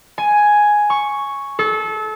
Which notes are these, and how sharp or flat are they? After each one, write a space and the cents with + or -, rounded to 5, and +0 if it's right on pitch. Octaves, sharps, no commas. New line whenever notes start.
G#5 +5
C#6 +0
A4 -30